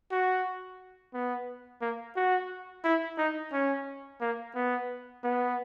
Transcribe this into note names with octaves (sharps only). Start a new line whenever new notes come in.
F#4
B3
A#3
F#4
E4
D#4
C#4
A#3
B3
B3